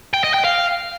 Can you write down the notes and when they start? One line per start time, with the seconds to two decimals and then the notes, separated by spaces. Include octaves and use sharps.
0.14 G5
0.24 D#5
0.34 G5
0.44 F5